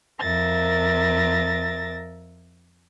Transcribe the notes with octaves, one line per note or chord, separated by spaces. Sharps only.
F2 A#4 E5 A6 A#6